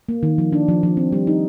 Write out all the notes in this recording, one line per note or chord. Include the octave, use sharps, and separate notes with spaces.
A#3
D#3
F3
D4
F3
F3
C4
G3
D#4